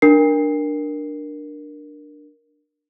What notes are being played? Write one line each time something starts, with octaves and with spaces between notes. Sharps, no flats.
D4 A#4 C7